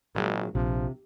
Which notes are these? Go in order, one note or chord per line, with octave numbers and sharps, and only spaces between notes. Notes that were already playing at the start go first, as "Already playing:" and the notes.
G#1 A#2 F#3 G#3
A#1 C3 F3